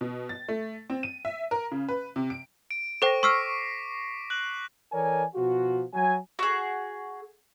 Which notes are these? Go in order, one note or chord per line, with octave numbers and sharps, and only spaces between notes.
B2
A6
A3
C4
D#7
E5
A#4
C#3
B4
C3
D7
D7
A4 C5 G5 C#6 A#6
C#6 D6 E6 F6 B6 C7
F#6 F#7
E3 A4 A#4 C#5 D5 G#5
B2 F3 F4 F#4
F#3 G#5
F#4 G#4